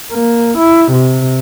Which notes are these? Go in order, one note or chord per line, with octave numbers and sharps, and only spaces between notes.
A#3
E4
C3